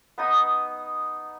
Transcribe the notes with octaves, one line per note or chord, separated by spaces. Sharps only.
B3 D#4 D#6